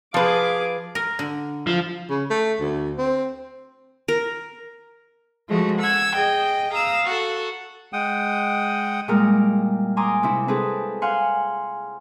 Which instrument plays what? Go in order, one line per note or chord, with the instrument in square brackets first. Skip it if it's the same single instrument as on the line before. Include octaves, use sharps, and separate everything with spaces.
[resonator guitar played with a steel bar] F3 B4 [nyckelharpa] G#4 D6 [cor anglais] F5
[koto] A#4
D3
[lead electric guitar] F3
[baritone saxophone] C#3
A3
D2
C4
[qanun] A#4
[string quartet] F3 G#3 A3 F#4
F#5 E6 G#6
G#4 D#5 G5
F5 A#5 D#6 E6
F#4 A4
[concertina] G#3 F#5 G5 D#6
[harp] A#2 G3 G#3 E4 A#4 G5
G#5 A#5 C6 D6 D#6
C3 C4 E4
C4 E4 G#4 A4 B4
F5 F#5 G#5 C6